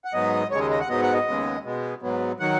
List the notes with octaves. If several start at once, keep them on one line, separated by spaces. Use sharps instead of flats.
F#5
G#2 F#3 B3 D#5
D#2 C#3 G#3 C#5
D#5
D#5
F#5
G#2 F#3 B3 D#5
F#5
D#5
D#2 C#3 G#3 B3
B2 G#3 B3
G#2 F#3 B3
D#3 F#3 F#5